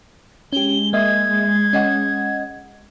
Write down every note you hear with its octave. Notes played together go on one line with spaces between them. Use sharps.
G#3 C#4 G4 G7
A#3 D#5 E5 G#6
C#4 D#5 F#5